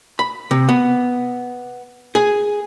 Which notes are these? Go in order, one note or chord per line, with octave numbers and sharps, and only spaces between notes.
B5
C3
B3
G#4